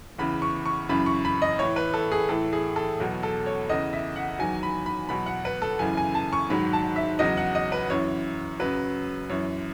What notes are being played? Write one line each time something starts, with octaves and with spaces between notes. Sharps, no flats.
E2 C#3 E3 B5
C#6
C#6
F#2 C#3 E3 B5
C#6
B5
D#5
A2 E3 C#5
B4
A4
G#4
A2 E3 A4
G#4
A4
E2 B2 F#3
A4
C#5
E2 C#3 E3 D#5
E5
F#5
E2 D#3 F#3 G#5
B5
B5
E2 B2 F#3 B5
F#5
B4
A4
F#2 C#3 E3 G#5
G#5
A5
C#6
G#2 D#3 F#3 B5
A5
E5
E2 C#3 F#3 D#5
F#5
D#5
B4
F#2 E3 C#5
F#2 C#3 F#3 B4
F#2 E3 C#5